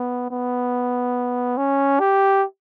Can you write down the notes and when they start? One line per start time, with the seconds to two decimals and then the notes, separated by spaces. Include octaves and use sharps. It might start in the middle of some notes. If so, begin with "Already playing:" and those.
Already playing: B3
0.30 B3
1.57 C#4
2.00 G4